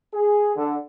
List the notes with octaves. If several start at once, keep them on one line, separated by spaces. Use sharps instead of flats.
G#4
D3